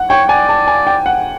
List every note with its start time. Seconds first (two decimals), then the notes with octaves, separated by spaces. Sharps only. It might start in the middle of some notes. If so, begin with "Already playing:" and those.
Already playing: F#5
0.10 C#5 G5
0.29 D5 G#5
0.49 A5
0.68 G#5
0.87 G5
1.06 F#5